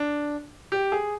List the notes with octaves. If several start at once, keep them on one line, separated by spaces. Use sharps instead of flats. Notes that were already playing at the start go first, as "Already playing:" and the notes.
Already playing: D4
G4
G#4